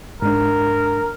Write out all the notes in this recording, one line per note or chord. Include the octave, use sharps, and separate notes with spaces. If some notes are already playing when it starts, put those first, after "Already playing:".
G#2 D4 A#4